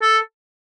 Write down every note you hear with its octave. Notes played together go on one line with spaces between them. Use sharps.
A4